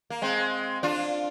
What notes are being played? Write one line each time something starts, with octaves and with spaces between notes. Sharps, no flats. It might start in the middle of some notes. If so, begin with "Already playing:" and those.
A#3
G#3 C4
D4 F4